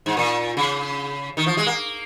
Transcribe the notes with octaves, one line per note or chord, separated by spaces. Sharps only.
G#2
A#2
C#3
D#3
F3
G#3
A#3